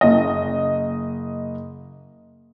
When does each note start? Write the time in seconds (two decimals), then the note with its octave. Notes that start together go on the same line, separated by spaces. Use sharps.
0.01 F#1 D#5